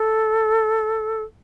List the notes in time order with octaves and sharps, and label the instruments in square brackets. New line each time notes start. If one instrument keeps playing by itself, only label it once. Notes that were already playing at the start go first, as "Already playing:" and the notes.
Already playing: [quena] A4